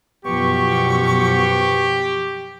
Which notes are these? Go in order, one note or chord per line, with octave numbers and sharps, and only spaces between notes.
F#2 B2 F3 B3 G4 C#6